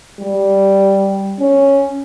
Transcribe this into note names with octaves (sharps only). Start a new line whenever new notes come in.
G3
C#4